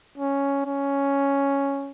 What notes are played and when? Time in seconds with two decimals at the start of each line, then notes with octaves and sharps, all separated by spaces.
0.18 C#4
0.66 C#4